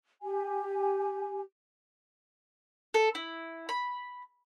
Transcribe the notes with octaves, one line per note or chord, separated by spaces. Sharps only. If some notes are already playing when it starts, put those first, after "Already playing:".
G4 G#5
A4
E4
B5